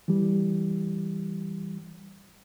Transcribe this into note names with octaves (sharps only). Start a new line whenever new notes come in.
E3 G3